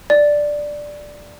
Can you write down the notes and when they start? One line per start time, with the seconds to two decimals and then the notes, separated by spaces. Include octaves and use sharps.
0.10 D5